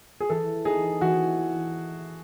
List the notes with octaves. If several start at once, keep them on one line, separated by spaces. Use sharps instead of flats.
G#4
E3 A4
B3 D#4 G#4
E3 F#4